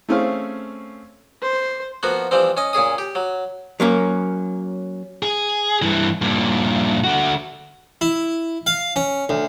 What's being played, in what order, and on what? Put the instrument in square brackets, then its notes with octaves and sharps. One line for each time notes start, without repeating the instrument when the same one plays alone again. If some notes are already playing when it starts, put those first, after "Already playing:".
[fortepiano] A3 C4 C#4 G#4 C5 F5
[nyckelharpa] C5
[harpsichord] F3 A#3 B3 F#4
E3 F3 G3 C4
C#4 D#5
A#2 C#4 G#4 D#6
G4
F#3
[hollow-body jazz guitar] F#3 A#3 C#4
[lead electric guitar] G#4
G2 E3
G2 A#2
D3 F#4
[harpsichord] E4
F5
C#4
D2